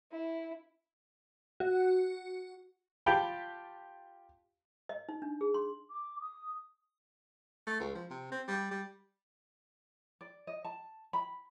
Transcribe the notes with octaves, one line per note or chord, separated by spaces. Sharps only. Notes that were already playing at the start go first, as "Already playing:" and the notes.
E4
F#4
F4 G4 G5 A5 B5
D#5
D#4
D4
G#4
C6
D6
D#6
A3
C#2
F3
C3
C4
G3
G3
D5
D#5
A5
B5